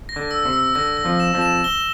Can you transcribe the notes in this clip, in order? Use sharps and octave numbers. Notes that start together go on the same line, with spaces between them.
A#6
D3
E6
C3
E6
D3 A#6
A#6
F2 F3
E7
F2 F3
E7
G7